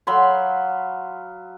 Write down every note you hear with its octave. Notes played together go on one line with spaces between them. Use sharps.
F#3 F5 B5 C6